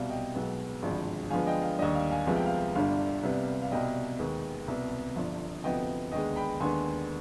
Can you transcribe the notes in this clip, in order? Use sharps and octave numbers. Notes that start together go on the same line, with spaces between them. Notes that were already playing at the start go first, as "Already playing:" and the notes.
Already playing: C2 B2 G3 F5
D#5 G5
B1 B2 G#3 B3
G#1 G2 D3 F3 G#3
G2 D3 F3 G#3 B3 F5 G#5
D#5 G5
F5
D#2 D3 G3 D#5
F5
F5 G#5
C2 C3 F3 G#3 B3 F5
G5
F5
G1 G2 D3 G3 F5
C2 C3 G3 B3
F5
C2 B2 G3 D#5 G5
D#2 D#3 G#3 B3
C2 B2 B3
G1 G2 F3
D2 C3 F3 B3 D#5 G5
D#2 D3 G#3 B3 D#5 G5
G5 B5
D#2 D3 G#3 B3 G#5 C6